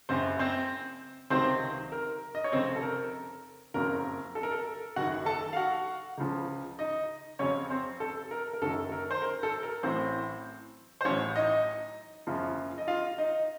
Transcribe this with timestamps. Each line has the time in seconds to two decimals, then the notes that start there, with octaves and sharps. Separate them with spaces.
0.09 F#1 F#2 C#3 C4 C5
0.39 C4 C5
1.30 C#2 C3 D#3 F#3 C4 C5
1.92 A#4
2.35 D#5
2.44 C#5
2.52 F1 F2 C#3 C4 C5
2.76 A4
2.82 A#4
3.74 F#1 F2 C#3 F#3 A#4
4.35 A4
4.43 A#4
4.51 A4
4.96 F#1 F#2 D#3 F#4 F#5
5.26 A4 A5
5.53 F5
5.56 F#4 F#5
6.18 C#2 C#3 F3
6.79 D#4 D#5
7.39 F2 C#3 F#3 C#4 C#5
7.70 C4 C5
8.00 A4
8.31 A#4
8.53 A#4
8.62 F#1 F#2 D#3 F#3 A4
8.92 A#4
9.11 C5
9.22 A#4
9.43 A4
9.63 A#4
9.83 A1 A2 F#3 C4 C5
11.01 C5
11.05 A1 A2 F#3 C#4 C#5
11.36 D#4 D#5
12.27 F#1 F#2 C#3 F3
12.78 D#5
12.88 F4 F5
13.18 D#4 D#5